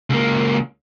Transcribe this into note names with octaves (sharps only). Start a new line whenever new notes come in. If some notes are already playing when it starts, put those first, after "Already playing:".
C#2 A#3